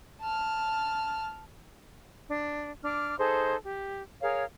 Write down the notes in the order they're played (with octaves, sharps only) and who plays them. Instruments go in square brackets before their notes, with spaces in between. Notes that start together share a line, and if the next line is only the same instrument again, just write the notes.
[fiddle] A5 F6
[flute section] D4
D4 D6 F6
D#4 G#4 A4 C5
G4
G#4 A#4 C#5 F5